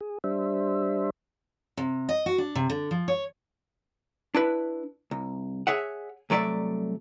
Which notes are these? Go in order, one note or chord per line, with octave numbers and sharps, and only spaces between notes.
G#4
G3 D4 C5 E5
C3
D#5
F#4
D4
C3
D3
F3
C#5
D4 E4 B4
C2
G#4 C#5 E5 F#5
C2 F#3 A3 D5 E5